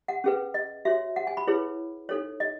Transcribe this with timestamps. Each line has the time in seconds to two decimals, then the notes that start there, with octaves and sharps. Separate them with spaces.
0.08 F#5
0.24 C#4 G#4 B4
0.54 D#5
0.85 F#4 C#5 E5
1.16 F#5
1.27 G#5
1.37 B5
1.47 E4 G#4 B4 C#5
2.09 D#4 A4 C#5
2.40 D#5